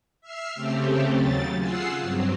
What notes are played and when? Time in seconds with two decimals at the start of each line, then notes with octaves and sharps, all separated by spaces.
0.21 E5 E6 F6 C7
0.54 C#3 A3 C4 G4
1.11 D#2 C#3 F#3 A6
1.57 F4 G#4 F#5 E6 C7
2.01 G2 F#3 C4